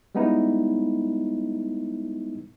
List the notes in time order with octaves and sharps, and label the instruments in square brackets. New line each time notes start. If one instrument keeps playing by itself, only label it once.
[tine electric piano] G3 G#3 B3 C#4 D#4 E4